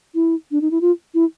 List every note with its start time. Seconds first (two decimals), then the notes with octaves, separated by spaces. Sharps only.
0.15 E4
0.51 D4
0.61 D#4
0.71 E4
0.81 F4
1.14 E4